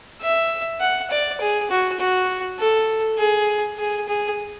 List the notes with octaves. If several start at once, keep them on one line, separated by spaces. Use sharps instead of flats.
E5
F#5
D5
G#4
F#4
F#4
A4
G#4
G#4
G#4